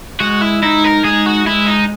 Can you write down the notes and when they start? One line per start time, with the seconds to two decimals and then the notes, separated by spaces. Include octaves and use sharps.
0.20 G#3 F#4
0.42 E4
0.63 D#4 E4
0.84 A#4
1.04 G#3 G#4
1.26 F#4
1.47 G#3 E4
1.67 D#4